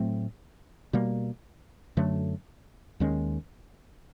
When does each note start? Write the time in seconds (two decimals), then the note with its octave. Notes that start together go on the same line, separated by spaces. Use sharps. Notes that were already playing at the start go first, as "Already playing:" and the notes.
Already playing: A2 F#3 A3 C4
0.93 B2 G3 A#3
1.97 F#2 D3 F#3 A3
3.00 D#2 D#3 G#3 C#4